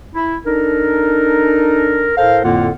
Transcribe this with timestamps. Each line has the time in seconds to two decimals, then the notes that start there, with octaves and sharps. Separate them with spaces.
0.15 E4
0.46 D4 D#4 A4 A#4
2.17 A2 A4 A#4 C5 F5
2.44 F2 A2 D3 A#3 F4 F#5